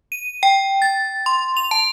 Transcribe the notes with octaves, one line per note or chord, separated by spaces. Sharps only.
D#7
G5
A6
C6
F7
A5